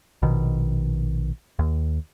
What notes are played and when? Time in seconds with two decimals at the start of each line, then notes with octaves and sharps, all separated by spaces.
0.22 A#1 B2 D#3
1.59 D#2